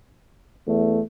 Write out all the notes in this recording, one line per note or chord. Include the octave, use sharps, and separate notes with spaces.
E2 A3